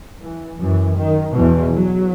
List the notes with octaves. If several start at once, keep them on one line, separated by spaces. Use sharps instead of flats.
E3
F#2 E3
D#3
E2 B2 E3
F#3